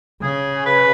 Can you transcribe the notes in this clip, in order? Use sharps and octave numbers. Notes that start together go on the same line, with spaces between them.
C#3 G#4
B4